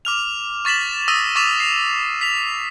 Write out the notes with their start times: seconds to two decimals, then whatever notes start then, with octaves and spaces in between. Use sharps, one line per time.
0.05 D6 F6 F7
0.65 C#6 A6 B6 E7 F#7
1.08 D#6 E6 A#6 D#7
1.35 C#6 D6 A6 B6 E7 F7
1.60 C7 F7
2.21 B6 F7